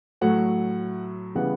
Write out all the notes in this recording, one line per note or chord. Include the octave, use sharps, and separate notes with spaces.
A2 F#3 A3 F#5
C#3 E3 G3 B3 F#5